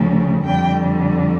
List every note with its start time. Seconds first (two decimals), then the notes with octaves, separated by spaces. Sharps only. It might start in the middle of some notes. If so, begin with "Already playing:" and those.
Already playing: D2 C#3 F3 A3
0.44 F2 D3 G3 G5